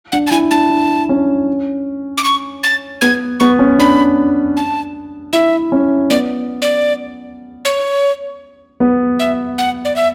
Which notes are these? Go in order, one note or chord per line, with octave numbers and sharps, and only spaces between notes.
D4 F#5
A5
E4 G#5
D4 A5
D4
C#4
D6
C#6
A6
B3 G#6
B3 C#6
C#4
D4 B5
A5
E4 E5
C#4
B3 D5
D5
C#5
B3
E5
F#5
D5
E5